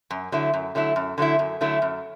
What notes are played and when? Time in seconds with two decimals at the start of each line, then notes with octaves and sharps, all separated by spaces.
0.11 F#2
0.32 D3 F#3 A3 E4
0.54 F#2
0.75 D3 F#3 A3 E4
0.96 F#2
1.18 D3 F#3 A3 E4
1.39 F#2
1.61 D3 F#3 A3 E4
1.82 F#2